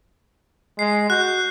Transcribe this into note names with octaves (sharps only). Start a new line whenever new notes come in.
G#3 C7
F#4 F#6 G6